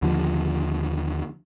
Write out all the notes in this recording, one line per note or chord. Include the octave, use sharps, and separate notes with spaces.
D#2 D3 F3